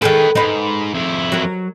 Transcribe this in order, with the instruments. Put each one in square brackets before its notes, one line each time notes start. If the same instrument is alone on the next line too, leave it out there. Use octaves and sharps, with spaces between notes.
[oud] D#3 G#4 A4 [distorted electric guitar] B4 G5
[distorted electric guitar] G#2 [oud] D#4 B4
[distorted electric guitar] F2 E4
[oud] F#3 A#4